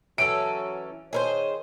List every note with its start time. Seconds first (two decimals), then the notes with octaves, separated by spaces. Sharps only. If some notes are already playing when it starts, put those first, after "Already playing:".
0.18 E3 F#3 C#4 A4 D7
1.13 D#3 G#4 A#4 C5 C#5